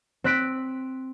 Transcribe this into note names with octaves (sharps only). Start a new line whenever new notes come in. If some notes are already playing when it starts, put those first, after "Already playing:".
C4 F#6 B6 D7